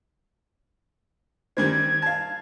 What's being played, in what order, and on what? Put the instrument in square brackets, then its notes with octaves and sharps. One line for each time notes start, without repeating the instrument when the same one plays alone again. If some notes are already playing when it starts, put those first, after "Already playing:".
[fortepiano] D#3 G3 C4 [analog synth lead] G#6
[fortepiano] F5 A5